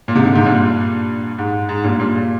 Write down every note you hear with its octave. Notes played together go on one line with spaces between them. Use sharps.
A#2
G#2 C3
A#2 D3
G#2 C3
G2 A#2
G#2
G#2
G2 A#2
G2 A#2
A#2